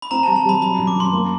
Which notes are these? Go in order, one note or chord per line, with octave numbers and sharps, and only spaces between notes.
B5
C4 A#5
A5
G3
A5
G3 B5
F#3 B5
F#2
D6
F#2 C6
A#3